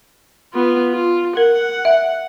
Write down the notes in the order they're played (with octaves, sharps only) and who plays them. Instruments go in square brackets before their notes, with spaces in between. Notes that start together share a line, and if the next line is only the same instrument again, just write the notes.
[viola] B3 F4
F4
[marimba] A#4 [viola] F#5
[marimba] E5